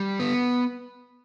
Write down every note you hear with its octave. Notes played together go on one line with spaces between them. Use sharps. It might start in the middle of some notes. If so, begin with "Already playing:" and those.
Already playing: G3
B3